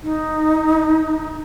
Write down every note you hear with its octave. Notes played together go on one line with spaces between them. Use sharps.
D#4